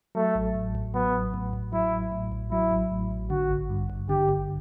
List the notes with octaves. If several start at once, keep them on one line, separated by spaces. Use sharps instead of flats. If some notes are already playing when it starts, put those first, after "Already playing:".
F#3 A3
A1
A2
A1
F#3 B3
A1
A2
A1
F#3 E4
A1
A2
A1
F#3 E4
A1
A2
A1
D3 F#4
G1
G2
G1
D3 G4
G1